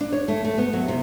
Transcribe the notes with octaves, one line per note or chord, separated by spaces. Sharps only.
D4
C#5
A3
A3
B3
F#3
C3